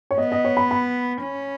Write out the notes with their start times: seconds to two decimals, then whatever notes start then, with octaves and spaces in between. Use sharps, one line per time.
0.11 C#5
0.18 B3 D#5
0.32 D#5
0.45 C#5
0.57 B5
0.71 B5
1.22 C#4